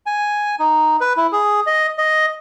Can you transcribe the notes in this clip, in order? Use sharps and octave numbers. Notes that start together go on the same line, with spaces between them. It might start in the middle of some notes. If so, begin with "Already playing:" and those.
G#5
D#4
B4
E4
G#4
D#5
D#5